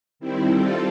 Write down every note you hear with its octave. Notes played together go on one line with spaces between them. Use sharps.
D#3 G3 C4 E4
G3 C4 F4 A4